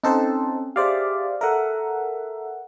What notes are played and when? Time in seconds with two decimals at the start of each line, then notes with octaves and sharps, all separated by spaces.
0.04 C4 C#4 D#4 A4 C5
0.76 G4 G#4 C5 D5 E5 F5
1.41 A4 A#4 E5 F#5